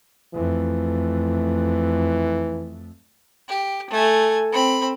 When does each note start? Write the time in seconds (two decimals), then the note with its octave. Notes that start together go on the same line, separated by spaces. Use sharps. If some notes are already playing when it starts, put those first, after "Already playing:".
0.34 F2 E3 A3
3.49 G4
3.91 A3 G#5
4.53 C4 B5